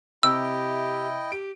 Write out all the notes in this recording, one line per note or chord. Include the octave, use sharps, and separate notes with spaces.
C3 E4 G4 D#5 G5 E6
G4 D7